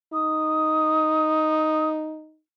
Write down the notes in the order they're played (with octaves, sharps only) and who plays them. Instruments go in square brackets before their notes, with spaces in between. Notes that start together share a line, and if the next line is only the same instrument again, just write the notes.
[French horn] D#4 [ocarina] D#6